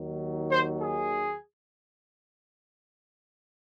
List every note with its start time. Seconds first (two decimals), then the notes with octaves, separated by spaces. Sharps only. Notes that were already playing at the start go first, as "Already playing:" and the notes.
Already playing: D#2 D#3 F#3
0.50 C5
0.81 G#4